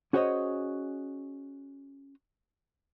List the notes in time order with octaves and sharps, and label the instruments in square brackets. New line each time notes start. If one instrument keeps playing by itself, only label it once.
[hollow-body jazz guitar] C#4 F#4 G#4 C5 C#5 D#5